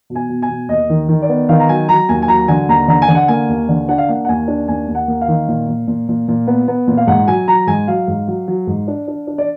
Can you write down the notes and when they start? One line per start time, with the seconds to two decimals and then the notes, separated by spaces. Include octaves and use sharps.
0.10 B2
0.15 G#5
0.29 B2
0.42 G#5
0.49 B2
0.69 D#2 D#5
0.89 D#3
1.09 D#3
1.22 D5
1.29 B3
1.49 D#3 F5
1.60 A#5
1.69 F#3 G#5
1.89 F#3 A#5
2.09 D#2 G#5
2.22 G#5
2.28 F#3 A#5
2.48 D3 G#5
2.68 D#2 A#5
2.88 D3 A#5
3.02 G#5
3.08 D3
3.15 F#5
3.28 A#3 G#5
3.49 D#2
3.68 D3
3.88 D4 F#5
3.98 F5
4.08 A#3 F#5
4.25 F#5
4.29 D#2 G#5
4.48 D4
4.68 D#2 G#5
4.88 D#2
4.95 F#5
5.08 A#3
5.21 F5
5.28 D#3
5.48 A#2
5.68 A#2
5.87 A#2
6.08 A#2
6.28 A#2
6.47 B3
6.68 B3
6.87 A#2
6.97 F5
7.07 G#2 F#5
7.28 F#3 G#5
7.48 F#3 A#5
7.67 G#2 G#5
7.88 F#3 F5
8.08 G#2
8.28 F#3
8.48 F#3
8.67 G#2
8.88 D4
9.08 D4
9.27 D4
9.38 D5